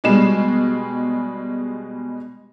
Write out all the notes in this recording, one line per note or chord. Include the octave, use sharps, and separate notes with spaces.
B2 G3 G#3 E7